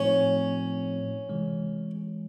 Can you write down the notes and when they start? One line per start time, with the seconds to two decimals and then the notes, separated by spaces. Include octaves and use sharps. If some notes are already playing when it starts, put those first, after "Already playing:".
Already playing: A2 F3 A3 C4 C#4 D#4
1.29 C3 E3 G#3